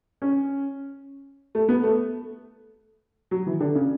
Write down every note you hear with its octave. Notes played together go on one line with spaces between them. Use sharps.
C#4
A3
B3
A3
F#3
E3
D3
C#3